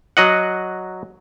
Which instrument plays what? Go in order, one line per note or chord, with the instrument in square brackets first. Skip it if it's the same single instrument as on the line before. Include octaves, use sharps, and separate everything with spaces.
[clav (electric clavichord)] F#3 D#5 F#5